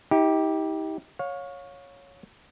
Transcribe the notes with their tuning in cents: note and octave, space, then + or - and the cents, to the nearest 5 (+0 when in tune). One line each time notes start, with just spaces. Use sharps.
D#4 +40 G4 +0
C#5 +0 F5 +30